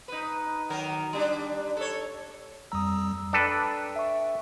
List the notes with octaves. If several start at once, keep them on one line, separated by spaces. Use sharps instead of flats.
D#4 B4
D#3 F#3 A#4
G3 D4
A4 C#5
F2 G3 A#5 D#6 E6
D4 A4 B4 G5
E5 C#6